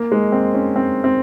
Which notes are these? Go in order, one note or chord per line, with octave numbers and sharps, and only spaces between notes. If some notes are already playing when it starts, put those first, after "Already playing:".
Already playing: A#3
G#3
C4
C#4
C4
C4